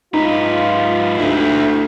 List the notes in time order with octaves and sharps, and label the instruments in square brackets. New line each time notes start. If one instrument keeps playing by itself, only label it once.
[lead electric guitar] G#2 B4 [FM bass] D#4 [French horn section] F4
[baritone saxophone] D2 [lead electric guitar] E4 G4